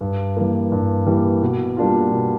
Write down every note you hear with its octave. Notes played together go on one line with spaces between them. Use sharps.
G2
E3 G3 A#3
G2
E3 G3 A#3
B2
G3 A#3 D4 F4
B2